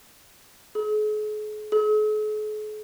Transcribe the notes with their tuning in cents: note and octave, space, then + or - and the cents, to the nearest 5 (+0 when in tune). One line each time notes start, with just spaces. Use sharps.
G#4 +40
G#4 +45